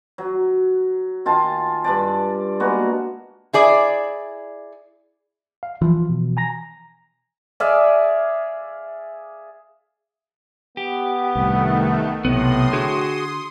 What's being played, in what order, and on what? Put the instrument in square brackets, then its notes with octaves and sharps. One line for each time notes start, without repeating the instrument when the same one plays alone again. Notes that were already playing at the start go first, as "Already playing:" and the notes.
[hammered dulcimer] F#3
D#3 F4 G#5 A5
G2 D4 D5
G#3 A#3 B3 F#4
[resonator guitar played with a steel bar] E4 G#4 D5
[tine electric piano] F5
[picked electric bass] E3 F3 [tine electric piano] F4
[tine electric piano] B2
G#5 A#5 A#6
[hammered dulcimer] G#4 D5 E5 F5
[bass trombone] B3 [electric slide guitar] G4
[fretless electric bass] C2 A2 [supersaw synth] D#3 A3
[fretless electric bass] B1 [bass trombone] A2 [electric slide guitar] C3 B3 [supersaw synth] C6 D#6
[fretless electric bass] D3 [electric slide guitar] F#4 G#4